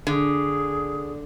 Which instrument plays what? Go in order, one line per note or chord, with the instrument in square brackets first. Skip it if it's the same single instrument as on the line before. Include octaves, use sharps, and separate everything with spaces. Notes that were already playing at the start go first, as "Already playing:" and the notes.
[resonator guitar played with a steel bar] D3 [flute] G#4